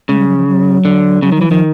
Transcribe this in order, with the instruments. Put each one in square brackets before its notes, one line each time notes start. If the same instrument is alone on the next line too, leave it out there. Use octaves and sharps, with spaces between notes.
[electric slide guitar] C#3 [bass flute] G#3
[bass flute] G3
F#3
F3
F#3
[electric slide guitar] D3
[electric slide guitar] C#3 [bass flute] F#3
[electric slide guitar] D#3
[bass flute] F#3
[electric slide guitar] E3
[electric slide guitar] D#3 [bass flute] F3